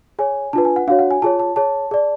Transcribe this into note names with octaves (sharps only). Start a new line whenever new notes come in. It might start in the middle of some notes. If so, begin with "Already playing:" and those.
G#4 C#5 G#5
D4 F4 B4 A5
G#5
F#5
D4 F#4 C#5 F5
F#5
G#5
F4 G#4 C#5 A5
A5
G#4 C#5 A5
G#4 D5